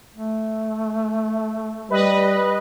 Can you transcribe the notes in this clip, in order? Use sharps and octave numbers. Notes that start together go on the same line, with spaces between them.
A3
G3 B4 D#5